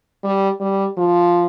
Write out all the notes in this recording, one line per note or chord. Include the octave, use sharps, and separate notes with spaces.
G3
G3
F3